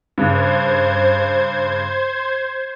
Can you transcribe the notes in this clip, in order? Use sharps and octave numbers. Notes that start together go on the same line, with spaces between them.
G2 C#3 C5 G#6